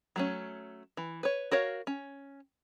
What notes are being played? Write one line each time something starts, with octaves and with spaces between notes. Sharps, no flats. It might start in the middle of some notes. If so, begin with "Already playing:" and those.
F#3 A3 C#4
E3
B4 C#5
F#4 A#4 C#5 F5
C#4